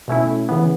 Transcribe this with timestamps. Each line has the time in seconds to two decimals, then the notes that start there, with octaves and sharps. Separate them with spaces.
0.08 B2 A3 C#4 E4
0.49 C#3 E3 B3